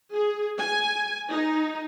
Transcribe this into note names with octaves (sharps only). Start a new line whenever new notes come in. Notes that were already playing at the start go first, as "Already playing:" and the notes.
G#4
G#5
D#4